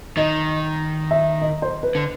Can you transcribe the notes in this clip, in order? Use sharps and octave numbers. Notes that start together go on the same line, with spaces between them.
D#3 D#5
E5
D#5
C5
B4
D3